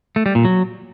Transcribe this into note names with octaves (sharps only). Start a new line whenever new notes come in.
A3
G3
A#2
F#3